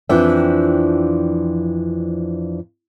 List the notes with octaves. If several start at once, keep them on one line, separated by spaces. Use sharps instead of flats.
F2 E3 F3 D4 E5 G5